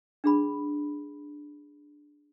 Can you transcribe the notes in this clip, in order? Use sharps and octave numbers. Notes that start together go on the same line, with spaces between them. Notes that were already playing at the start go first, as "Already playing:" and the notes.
D4 G#4 B5